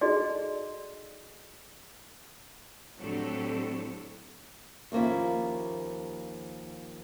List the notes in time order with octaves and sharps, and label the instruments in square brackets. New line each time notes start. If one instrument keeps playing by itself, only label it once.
[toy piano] D#4 F#4 G#4 A4 D5 D#5
[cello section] A2 D3 F#3 C4 G4 A4
[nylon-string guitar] D#2 F3 A#3 C#4 E4